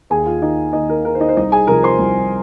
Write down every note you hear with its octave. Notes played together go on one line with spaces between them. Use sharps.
D#2 G#4 G#5
F4 F5
D#3 D#4 D#5
D#2 D#4 D#5
A#4
D#3 A#4
C5
D#4 D#5
C5
C2 D#4 D#5
G#4 G#5
C3 F3 A#4 A#5
C5 C6
C2